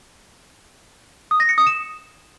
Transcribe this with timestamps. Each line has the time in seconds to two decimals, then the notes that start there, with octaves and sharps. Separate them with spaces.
1.31 D#6
1.40 A#6
1.49 C#7
1.58 D#6
1.67 E7